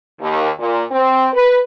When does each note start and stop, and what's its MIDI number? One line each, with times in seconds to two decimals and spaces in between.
0.21 0.49 39
0.59 0.84 46
0.91 1.28 60
1.34 1.58 71